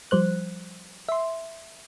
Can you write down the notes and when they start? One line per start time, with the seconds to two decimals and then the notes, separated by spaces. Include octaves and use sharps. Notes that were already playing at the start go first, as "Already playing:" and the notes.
0.11 F3 G3 C5 F#6
1.09 E5 C6